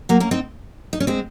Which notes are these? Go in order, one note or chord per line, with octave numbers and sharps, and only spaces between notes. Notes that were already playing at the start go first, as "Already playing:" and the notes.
F#3 A#3
A#3 C#4
C4 D#4
D#4
C#4
G#3 C4